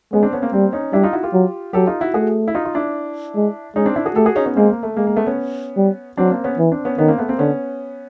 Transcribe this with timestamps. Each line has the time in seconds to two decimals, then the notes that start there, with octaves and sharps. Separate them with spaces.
0.13 G#3 B3 C#4
0.23 C4 D4
0.33 B3 C#4
0.42 A#3 C4
0.53 G3 A#3 C4
0.73 C#4 D#4
0.93 G3 D4 E4
1.03 D#4 F4
1.13 E4 F#4
1.23 F4 G4
1.33 F#3
1.73 F#3 G4 A4
1.87 D#4 F4
2.01 E4 F#4
2.14 A3 F#4 G#4
2.48 E4
2.55 D#4 F4
2.65 F4
2.75 D4 E4
3.36 G#3
3.76 G#3 C#4 D#4
3.86 C4 D4
3.96 D4 E4
4.06 F#4 G#4
4.15 A3 G4 A4
4.26 F#4 G#4
4.36 C#4 D#4
4.46 B3 C#4
4.56 G#3 A#3 C4
4.70 A#3
4.83 A3
4.96 G#3 A#3
5.07 A#3
5.17 A3 B3
5.27 B3 C#4
5.77 G3
6.18 F#3 C4 D4
6.31 A#3 C4
6.44 B3 C#4
6.58 E3
6.72 C4 D4
6.85 B3 C#4
6.98 D#3 B3 C#4
7.08 A#3 C4
7.18 A3 B3
7.29 A#3 C4
7.38 D3 B3 C#4